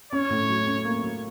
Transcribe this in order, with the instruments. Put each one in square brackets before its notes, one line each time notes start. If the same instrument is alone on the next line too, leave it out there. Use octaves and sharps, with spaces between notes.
[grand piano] C#4 [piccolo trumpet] C#5
[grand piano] A2
F#3
C#4
A#3
F#3